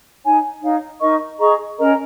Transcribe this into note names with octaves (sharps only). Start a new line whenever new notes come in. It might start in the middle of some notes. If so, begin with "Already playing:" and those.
D#4 C#5 G#5
D#4 C#5 F5
D#4 A#4 D#5 C#6
G#4 D#5 A#5 C#6
C#4 A#4 D#5 A#5